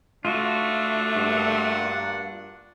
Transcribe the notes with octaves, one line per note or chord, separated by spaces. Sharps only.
A3 D4 F4 F#4
G2 A#3 F#5